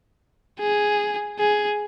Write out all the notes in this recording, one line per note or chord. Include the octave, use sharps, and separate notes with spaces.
G#4
G#4